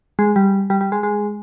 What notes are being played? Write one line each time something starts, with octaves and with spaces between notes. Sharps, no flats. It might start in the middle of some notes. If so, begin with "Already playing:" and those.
G#3
G3
G3
G3
G#3
G#3